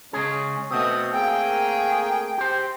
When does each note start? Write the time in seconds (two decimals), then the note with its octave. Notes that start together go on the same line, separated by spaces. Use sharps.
0.13 C#3 G#3 C#4 G#4
0.71 B2 A3 C4 D#6
1.13 A#3 G#4 G5
2.38 G4 C5